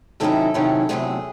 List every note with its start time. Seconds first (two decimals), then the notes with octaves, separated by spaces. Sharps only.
0.20 C3 D#3 F#3 C#4 E4 A4
0.54 C3 D#3 F#3 C#4 E4
0.89 E2 C3 F#3 A3 G#4